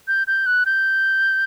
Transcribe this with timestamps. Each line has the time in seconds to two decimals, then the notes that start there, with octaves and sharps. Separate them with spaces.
0.08 G6
0.27 G6
0.46 F#6
0.66 G6